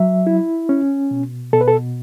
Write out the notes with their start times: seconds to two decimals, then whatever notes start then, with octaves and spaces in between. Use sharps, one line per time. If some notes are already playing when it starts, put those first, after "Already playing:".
Already playing: F#3 E5
0.27 E4
0.69 C#4
1.11 B2
1.53 B2 A4
1.61 B4
1.68 A4